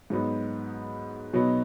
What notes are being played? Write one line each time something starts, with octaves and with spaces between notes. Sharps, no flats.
G#2 F#3 B3 D#4
B2 F#3 B3 D#4